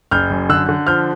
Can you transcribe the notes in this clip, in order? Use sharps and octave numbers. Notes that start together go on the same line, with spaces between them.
F#1 F6 G6
F#2
D3 E6 F#6
D3
F3 F6 G6